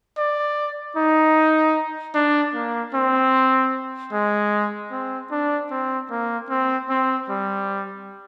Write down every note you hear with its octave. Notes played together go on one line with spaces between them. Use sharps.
D5
D#4
D4
A#3
C4
G#3
C4
D4
C4
A#3
C4
C4
G3